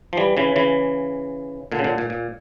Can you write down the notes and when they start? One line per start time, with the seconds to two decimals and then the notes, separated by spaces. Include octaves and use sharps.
0.13 F3
0.17 E3 G3
0.37 C#3 E3
0.56 C#3 E3
1.72 A#2 D3
1.79 C#3
1.84 A#2 D3
1.98 A#2
2.10 A#2